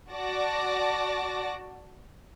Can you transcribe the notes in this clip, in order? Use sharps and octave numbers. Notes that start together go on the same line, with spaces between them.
F#4 D5 F#5 A5 D6 A#6